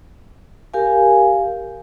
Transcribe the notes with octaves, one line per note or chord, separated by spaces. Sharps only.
G4 A#4 F5 G#5